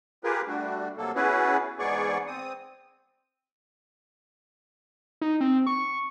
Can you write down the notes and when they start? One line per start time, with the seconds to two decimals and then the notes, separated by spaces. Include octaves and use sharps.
0.24 F4 G4 G#4 A#4 B4
0.47 G3 A3 D4 F#4
0.98 C3 F#3 A#3 A4
1.15 B3 C#4 E4 F#4 G#4 B4
1.79 E2 G#2 B3 G#4 D5 C#6
2.27 C4 D#6
5.21 D#4
5.41 C4
5.67 C#6